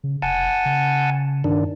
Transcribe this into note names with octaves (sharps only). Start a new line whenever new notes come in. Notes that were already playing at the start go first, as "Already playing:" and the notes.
C#3
F1 F#5 G#5 A5
C#3
G2 D#3 D4